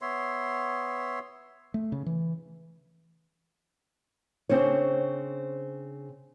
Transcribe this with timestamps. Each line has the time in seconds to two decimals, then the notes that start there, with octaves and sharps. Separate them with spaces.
0.02 B3 C#5 E5 C6
1.74 A3
1.92 C#3
2.06 E3
4.49 C#3 C4 D4 C5 C#5